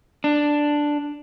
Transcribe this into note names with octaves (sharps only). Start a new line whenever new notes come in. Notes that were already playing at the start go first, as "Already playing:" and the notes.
D4